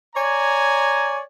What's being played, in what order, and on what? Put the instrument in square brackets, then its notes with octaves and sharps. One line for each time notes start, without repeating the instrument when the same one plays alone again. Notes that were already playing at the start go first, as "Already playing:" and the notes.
[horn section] C#5 D5 G#5 A#5